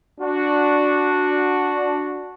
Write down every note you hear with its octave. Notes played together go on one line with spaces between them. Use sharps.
D4 F#4